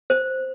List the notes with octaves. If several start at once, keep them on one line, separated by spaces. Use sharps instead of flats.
C5